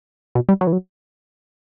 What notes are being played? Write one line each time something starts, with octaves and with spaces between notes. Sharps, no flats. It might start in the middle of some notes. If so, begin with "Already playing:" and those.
B2
G3
F#3
E3
F#3